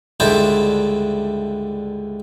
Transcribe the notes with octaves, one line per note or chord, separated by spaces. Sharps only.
C#2 G2 D3 D4 E4 C5